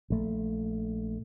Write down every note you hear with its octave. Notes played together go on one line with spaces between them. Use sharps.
A#1 A3